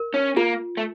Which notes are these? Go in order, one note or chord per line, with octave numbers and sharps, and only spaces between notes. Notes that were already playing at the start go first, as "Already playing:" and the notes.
Already playing: A#4
C#4
A#3 F4
A3